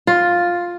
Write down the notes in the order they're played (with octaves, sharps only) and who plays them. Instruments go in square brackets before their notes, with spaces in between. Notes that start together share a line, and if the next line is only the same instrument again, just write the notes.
[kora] F4